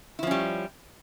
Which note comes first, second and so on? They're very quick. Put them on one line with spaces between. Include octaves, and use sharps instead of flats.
E4 F3 C#4 G3